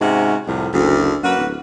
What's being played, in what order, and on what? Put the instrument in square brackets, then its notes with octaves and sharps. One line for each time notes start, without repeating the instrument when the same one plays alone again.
[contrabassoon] G#2 [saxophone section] C3 C#4 F#4
[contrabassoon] C2 [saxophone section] F2 A2 C3
[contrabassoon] F#1 [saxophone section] D2
[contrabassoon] F#2 [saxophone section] A#3 F#4 B4
[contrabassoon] D1